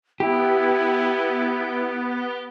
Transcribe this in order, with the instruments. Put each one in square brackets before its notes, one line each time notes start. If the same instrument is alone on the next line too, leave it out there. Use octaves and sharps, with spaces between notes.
[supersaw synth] B3 [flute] E4 [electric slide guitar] G4